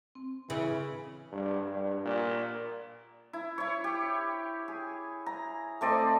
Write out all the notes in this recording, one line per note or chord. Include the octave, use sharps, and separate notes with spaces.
C4
C#3 E3
G2
G2
A#2
E4
E4 C#5
G4
G#4
A#5
A3 C4 D5 D#5